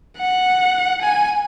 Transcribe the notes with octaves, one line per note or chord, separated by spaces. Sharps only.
F#5
G#5